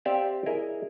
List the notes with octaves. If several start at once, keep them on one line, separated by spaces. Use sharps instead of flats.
C4 G4 D5 E5 F5
E4 G#4 A#4 D#5